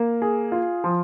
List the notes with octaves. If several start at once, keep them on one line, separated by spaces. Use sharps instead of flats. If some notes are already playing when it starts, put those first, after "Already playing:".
Already playing: A#3
G#4
F4
F3